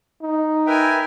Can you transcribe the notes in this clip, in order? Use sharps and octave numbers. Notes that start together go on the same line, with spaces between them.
D#4
A#4 B4 E5 G5 G#5